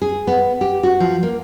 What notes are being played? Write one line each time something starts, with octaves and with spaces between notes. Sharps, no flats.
G#4
B3
G4
F#4
F3
A#3